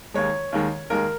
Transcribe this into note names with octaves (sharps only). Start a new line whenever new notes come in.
D#2 D#3 G#3 C#5
D#2 D#3 G#3
D#2 D#3 G#3 A#4